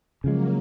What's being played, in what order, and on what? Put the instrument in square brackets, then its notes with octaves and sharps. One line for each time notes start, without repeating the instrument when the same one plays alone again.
[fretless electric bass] C#3 F3 G#3 [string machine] F#3 A#3